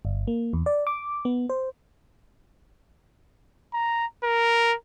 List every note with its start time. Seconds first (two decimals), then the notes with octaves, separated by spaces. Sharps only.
0.05 G1
0.27 A#3
0.53 E2
0.66 D5
0.87 D6
1.25 B3
1.49 C5
3.74 A#5
4.23 A#4